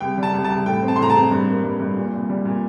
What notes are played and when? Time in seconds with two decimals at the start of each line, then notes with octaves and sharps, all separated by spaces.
0.01 C2 G5
0.17 G3
0.23 A5
0.34 C2
0.44 A5
0.50 C2
0.66 A2 G5
0.83 C4
0.88 A5
0.96 C6
0.99 A2 A#5
1.10 A5
1.15 C4
1.31 G2
1.48 A#3
1.64 G2
1.80 G2
1.97 A#2
2.13 C2
2.29 G3
2.45 A#2